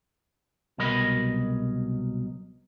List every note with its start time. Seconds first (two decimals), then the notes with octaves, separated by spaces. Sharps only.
0.78 C2 B2 F#3 A#4 D#5 B5